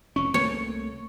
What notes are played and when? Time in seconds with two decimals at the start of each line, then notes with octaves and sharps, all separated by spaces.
0.16 F1 C#4 C#6
0.34 C2 A3 A#3 C#5